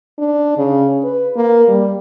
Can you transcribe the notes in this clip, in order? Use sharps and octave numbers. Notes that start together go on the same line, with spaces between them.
D4
C#3
B4
A#3
G3